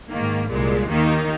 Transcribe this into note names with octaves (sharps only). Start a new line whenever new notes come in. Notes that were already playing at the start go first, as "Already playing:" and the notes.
G#2 D#3 A#3
C2 A#2 G#3
D#2 D#3 A#3 D#4